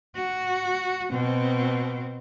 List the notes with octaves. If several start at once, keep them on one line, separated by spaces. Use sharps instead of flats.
F#4
B2 C4